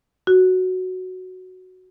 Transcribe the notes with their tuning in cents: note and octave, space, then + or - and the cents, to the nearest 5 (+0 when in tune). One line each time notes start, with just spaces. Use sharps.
F#4 +0